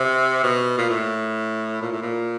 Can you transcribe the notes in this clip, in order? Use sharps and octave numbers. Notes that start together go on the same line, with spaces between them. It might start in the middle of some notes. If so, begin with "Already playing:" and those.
Already playing: C3
B2
A#2
A2
A#2
A2
A#2